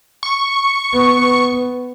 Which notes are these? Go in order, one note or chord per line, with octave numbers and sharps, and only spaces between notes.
C#6
B3